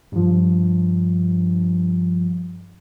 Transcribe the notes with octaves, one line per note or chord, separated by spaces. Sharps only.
G2 F3